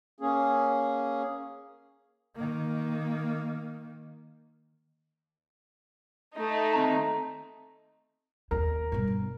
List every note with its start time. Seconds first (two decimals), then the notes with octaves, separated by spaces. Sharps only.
0.20 A#3 C#4 G#4
2.36 D#3 A#3
6.36 A3 D#4
6.73 D#2 C4 A#5
8.51 D#2 A#4
8.92 G2 B2